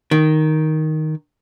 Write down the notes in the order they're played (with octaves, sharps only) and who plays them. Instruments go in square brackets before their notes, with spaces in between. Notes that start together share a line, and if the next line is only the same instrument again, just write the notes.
[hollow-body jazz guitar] D#3